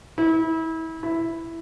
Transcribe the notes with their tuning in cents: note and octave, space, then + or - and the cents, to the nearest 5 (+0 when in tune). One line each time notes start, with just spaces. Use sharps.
E4 -30
E4 +0